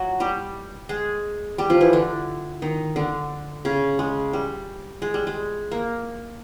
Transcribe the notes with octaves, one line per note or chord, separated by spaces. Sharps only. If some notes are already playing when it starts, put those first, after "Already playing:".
Already playing: F#3 F#4
G3 G4
G#3 G#4
G3 G4
F3 F4
E3 E4
D3 D4
D#3 D#4
D3 D4
C#3 C#4
G#3
G3
G#3
G3
G#3
A#3